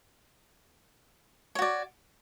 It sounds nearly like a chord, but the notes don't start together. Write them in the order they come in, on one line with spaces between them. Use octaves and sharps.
C#5 F#4 D5